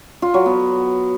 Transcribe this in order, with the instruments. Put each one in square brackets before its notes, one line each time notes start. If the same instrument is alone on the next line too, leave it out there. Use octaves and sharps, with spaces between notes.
[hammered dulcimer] F4
F#3
B3